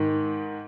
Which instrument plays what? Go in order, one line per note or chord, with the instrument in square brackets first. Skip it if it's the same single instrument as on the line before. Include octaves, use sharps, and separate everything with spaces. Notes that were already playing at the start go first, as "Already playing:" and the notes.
Already playing: [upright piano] G#2 D#3